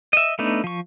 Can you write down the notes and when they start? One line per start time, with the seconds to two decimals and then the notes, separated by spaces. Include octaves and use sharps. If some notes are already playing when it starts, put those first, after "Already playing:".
0.13 D#5 E5
0.39 A3 B3 D4 D#4
0.64 F3 C#6